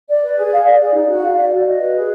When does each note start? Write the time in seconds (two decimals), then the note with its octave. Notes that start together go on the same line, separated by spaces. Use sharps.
0.09 D5
0.23 B4
0.37 G#4
0.51 F5
0.66 D5
0.80 G#4
0.94 D#4
1.08 F#4
1.22 F5
1.37 D5
1.52 F#4
1.66 D#5
1.80 B4
1.95 G#4